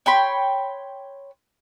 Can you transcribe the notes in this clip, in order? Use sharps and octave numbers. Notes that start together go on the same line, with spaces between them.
C#5 G5 B5 C6